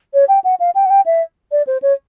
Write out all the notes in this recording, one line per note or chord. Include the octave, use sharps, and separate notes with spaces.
C#5
G5
F#5
F5
G5
F#5
G5
E5
D5
C5
C#5